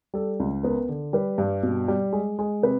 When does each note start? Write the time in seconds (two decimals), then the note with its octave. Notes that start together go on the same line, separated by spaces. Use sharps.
0.14 G3 A4
0.40 C#2
0.63 B3 A#4
0.89 D3
1.13 G3 B4
1.38 G2
1.63 B2
1.88 G3
2.13 G#3
2.39 G#3
2.63 C3 B4